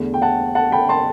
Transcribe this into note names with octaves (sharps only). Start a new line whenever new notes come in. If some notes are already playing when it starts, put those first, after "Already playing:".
Already playing: E2 D3 A3
G5
F#5 A5
F#5 A5
G5 B5
A5 C6